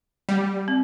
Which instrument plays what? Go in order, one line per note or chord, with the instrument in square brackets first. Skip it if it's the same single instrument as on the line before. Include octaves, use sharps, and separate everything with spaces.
[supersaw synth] G3 [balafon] A3
[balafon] C4